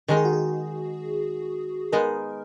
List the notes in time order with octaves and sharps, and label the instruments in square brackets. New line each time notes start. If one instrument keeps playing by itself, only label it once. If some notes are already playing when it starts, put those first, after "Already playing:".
[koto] D#3 G#3 D#4 [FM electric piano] A#4
[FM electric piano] G#4
F#4
G#4
[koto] G#3 B3 D#4 [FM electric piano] A#4